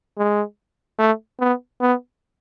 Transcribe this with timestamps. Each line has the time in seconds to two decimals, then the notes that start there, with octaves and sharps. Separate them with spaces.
0.17 G#3
0.99 A3
1.40 B3
1.81 B3